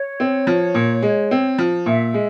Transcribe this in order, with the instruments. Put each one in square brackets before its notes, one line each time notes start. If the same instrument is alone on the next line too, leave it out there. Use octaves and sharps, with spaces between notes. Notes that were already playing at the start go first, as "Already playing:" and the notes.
Already playing: [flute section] C#5
[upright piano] C4
F3
A#2
G#3
C4
F3
[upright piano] A#2 [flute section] E5
[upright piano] G#3